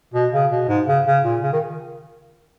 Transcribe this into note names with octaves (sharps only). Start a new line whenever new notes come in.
B2
C#3
B2
G#2
C#3
C#3
A#2
C#3
D#3